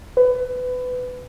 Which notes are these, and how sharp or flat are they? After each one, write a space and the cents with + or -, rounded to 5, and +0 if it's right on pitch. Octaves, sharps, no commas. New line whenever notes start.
B4 +20